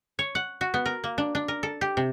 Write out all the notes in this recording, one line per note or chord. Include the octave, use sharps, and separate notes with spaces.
C#5
F#5
F#4
B3
A#4
A#3
D4
D4
A#4
A4
G4
C3